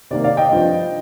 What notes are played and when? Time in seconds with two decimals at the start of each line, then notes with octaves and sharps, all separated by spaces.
0.11 C3 D#3 A#3 D5
0.24 D5 F5
0.37 D#5 G5
0.52 G2 F3 C4